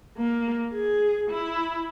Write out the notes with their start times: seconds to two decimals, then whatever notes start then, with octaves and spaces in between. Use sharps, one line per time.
0.18 A#3
0.73 G#4
1.31 E4